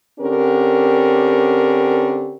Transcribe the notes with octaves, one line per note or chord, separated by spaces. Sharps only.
D3 C4 C#4 G4 A#4